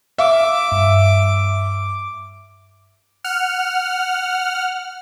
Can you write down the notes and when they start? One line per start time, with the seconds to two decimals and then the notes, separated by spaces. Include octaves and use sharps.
0.18 E5 F5 D6
0.72 G2
3.24 F#5 F6